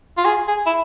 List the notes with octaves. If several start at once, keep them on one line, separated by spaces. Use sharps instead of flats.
F4
G#4
G#4
E4